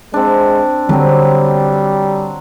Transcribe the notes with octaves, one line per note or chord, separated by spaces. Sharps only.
G#3 C4 D4
D3 F#3 G3 C4